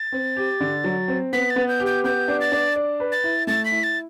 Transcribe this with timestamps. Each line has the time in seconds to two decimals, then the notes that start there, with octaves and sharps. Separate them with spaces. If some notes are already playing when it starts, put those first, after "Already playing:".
Already playing: A6
0.12 C4
0.36 G4
0.60 D3
0.84 F#3
1.08 C4
1.33 B3 B6
1.50 A6
1.56 B3
1.68 G6
1.80 G4
1.86 G6
2.04 B3 G6
2.28 D4
2.41 A6
2.52 D4
2.76 D5
3.00 B4
3.12 A6
3.24 E4
3.47 A3 A6
3.65 B6
3.72 E4
3.83 A6